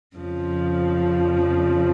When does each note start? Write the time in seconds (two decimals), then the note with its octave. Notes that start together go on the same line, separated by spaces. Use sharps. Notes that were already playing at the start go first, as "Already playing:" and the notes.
0.16 F2 C#3 F3